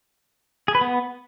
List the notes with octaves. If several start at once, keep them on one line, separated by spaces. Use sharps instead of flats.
G#4
B4
B3